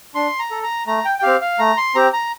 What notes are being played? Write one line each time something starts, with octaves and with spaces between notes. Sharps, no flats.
D4 C6
A#5
A4
A#5
A3 A#5
G5
G5
C4 G4 F5
F5
A3 A#5
C6
C4 G4 A#5
A#5